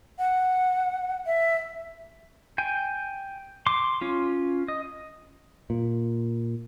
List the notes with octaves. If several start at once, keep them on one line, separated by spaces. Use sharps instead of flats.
F#5
E5
G5 G#5
C6 D6
C#4 F4
D#5
A#2